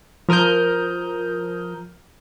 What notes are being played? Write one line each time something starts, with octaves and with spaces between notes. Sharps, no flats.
F3 A#4 D#6 F6 G6